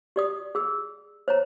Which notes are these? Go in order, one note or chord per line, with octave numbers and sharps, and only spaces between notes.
G4 D5 D#6
G#4 E6
C5 C#5 A#5